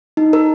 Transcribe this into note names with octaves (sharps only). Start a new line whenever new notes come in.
D#4
A#4